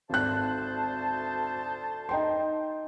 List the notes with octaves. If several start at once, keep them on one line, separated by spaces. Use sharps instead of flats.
G#1 D2 C5 A5 F#6
D#4 G5 C6